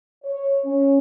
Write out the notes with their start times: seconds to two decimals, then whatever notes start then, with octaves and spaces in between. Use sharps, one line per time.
0.25 C#5
0.65 C#4